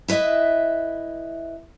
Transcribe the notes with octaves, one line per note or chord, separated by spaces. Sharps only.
E4 B4 C#5 D#5 E5